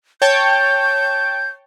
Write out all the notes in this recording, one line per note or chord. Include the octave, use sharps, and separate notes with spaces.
C#5 G5 A5 G6